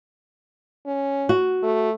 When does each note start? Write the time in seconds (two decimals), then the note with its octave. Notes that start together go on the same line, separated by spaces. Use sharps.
0.87 C#4
1.29 F#4
1.63 A3